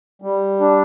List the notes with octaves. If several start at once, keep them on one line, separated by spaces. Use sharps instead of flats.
G3
D4